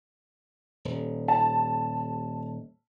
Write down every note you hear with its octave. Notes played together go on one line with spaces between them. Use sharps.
D#1
A5